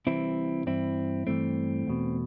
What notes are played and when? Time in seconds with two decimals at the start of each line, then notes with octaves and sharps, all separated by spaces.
0.07 C2 C3 E3 C4 E4
0.66 G2 E3 C4 E4
1.27 G2 E3 A3 C4
1.87 E2 B2